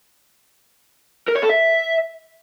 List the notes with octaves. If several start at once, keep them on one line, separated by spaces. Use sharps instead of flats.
A#4
C#5
A4
E5